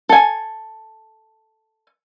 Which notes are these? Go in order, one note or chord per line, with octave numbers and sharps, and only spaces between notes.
A4 G#5